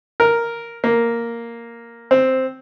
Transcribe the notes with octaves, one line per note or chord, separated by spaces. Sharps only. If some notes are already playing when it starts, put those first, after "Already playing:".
A#4
A#3
C4